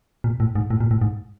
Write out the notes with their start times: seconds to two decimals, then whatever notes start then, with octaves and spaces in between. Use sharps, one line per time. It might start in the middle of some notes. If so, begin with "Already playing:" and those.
0.24 A#2
0.40 A2
0.55 G#2
0.70 A2
0.81 A#2
0.91 A2
1.01 G#2